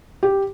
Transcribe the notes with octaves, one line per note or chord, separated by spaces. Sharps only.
G4